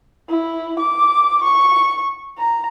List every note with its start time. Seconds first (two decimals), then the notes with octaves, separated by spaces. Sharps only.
0.29 E4
0.79 D6
1.44 C#6
2.38 A#5